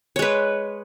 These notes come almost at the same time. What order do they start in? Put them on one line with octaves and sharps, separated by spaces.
C#5 G#3 B4